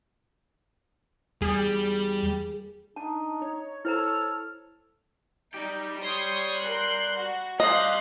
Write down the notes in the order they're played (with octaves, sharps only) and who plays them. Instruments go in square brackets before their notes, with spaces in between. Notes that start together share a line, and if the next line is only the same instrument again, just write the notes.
[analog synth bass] E2 [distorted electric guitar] G3 [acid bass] G#4
[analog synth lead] D4 [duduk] D#4 [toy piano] A5
[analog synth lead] C#5
[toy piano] E4 C5 A#5 [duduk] A4 [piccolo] F6
[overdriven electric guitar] G3 G4 [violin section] D#4
[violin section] C#5 C6 D#6
A#4 C6 F#6
F#4
[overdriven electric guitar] G2 G4 [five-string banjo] D#5 [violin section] F5 C6 F#6